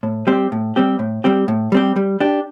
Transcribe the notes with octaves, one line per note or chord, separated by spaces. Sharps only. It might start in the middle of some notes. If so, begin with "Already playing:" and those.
A2
G3 C4 G4
A2
G3 C4 G4
A2
G3 C4 G4
A2
G3 C4 G4
G3
D4 G4